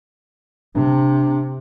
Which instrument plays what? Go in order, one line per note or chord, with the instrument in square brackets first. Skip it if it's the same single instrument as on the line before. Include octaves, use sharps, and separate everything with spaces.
[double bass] C3 [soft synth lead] D4